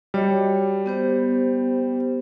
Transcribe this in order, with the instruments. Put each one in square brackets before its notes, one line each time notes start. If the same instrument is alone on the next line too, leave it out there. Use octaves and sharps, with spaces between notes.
[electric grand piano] G3 [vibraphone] F#4 C#5 D#5
[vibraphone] B3 G4 C5